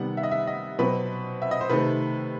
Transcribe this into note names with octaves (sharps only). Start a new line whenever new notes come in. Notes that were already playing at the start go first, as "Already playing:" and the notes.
Already playing: C3 D#3 G3 B3 F#5
E5
D#5
E5
D#5
B2 F#3 C4 B4
E5
D#5
C5
C3 D#3 A3 C4 B4